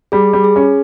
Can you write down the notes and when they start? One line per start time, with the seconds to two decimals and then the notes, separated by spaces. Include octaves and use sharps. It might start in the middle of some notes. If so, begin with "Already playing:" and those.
0.12 G3 G#4
0.33 G3
0.44 G#4
0.56 C#4